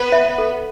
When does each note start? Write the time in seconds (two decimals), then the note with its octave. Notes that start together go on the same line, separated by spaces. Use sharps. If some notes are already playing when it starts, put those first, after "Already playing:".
Already playing: B3 B4
0.12 E5
0.38 A4